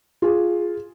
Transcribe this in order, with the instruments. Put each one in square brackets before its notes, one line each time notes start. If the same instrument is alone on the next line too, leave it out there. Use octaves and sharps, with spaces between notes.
[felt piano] F4 G#4